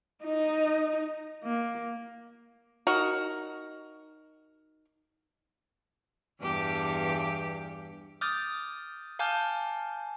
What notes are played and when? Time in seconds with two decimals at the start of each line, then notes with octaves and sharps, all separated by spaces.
0.24 D#4
1.44 A#3
2.87 D#4 F#4 A#4
6.41 E2 G2 G4
8.21 D6 D#6 F6 G6 A6
9.19 F5 G#5 A5 D6 F6 G6